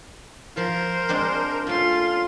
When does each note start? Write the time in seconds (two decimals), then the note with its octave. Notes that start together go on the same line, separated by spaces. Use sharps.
0.57 F3 A#4 C5
1.09 G#3 C4 D4
1.67 A3 C#4 F4 C6